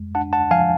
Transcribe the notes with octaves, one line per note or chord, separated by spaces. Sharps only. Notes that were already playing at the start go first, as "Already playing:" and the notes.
Already playing: F2 G#3
D4 F#5 A5
F#5 A5
F3 F5 G#5